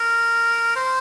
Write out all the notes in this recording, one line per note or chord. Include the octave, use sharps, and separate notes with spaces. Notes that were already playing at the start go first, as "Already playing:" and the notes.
Already playing: A#4
C5